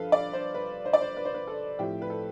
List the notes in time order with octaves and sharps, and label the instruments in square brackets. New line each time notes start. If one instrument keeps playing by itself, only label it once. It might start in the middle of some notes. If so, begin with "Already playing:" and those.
Already playing: [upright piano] G2 F3 A4 B4 F5
D5
C5
B4
C5
D5
C5
B4
C5
B4
A4
A2 F3 A3 C4 G4
B4
A4